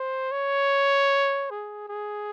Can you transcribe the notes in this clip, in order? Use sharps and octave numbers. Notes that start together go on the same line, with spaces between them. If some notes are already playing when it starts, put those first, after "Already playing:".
Already playing: C5
C#5
G#4
G#4